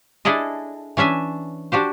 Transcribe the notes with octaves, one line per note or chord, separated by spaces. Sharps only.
D4 E4 G#4 A4 D#5
E3 C#4 D4 E5 G#5
D4 F#4 G4 C5